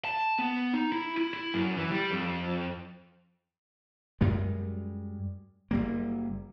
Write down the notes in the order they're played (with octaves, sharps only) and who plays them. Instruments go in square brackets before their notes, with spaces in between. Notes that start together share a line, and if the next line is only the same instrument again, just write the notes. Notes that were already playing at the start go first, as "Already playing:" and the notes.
[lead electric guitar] A5
B3
D#4
E4
E4
E4
F#2
E3
G3
F2
[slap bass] F#2 G3 G#3
F#1 G3 A#3